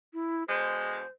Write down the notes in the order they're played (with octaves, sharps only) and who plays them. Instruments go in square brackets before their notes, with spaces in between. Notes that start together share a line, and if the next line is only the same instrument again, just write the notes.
[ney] E4
[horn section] B2 D3 G#3 [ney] C5